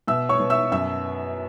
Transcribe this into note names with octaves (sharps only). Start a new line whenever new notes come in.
B2 E5 E6
C#5 C#6
B2
E5 E6
F#2 E5 E6